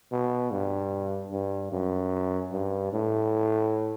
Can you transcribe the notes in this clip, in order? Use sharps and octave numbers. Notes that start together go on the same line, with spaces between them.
B2
G2
G2
F#2
G2
A2